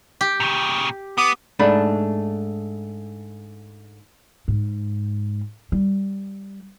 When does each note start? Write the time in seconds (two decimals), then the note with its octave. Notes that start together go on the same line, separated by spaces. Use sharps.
0.21 G4
0.40 A#2 C#3
1.18 B3 D6 D#6
1.59 G#2 A3 D4 B5
4.48 G#2
5.72 G3